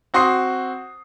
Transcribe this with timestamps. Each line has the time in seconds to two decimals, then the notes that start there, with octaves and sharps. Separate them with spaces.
0.14 C4 F#4 C6 D#6 C7